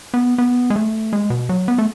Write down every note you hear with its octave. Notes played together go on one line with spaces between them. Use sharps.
B3
B3
G#3
A3
G#3
B2
F#3
B3
A3